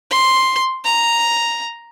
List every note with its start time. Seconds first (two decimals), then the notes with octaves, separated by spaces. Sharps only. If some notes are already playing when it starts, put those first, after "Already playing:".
0.10 C6
0.85 A#5